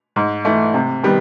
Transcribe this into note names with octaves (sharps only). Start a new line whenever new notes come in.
G#2
E3 A3
C3
D#3 G3 B3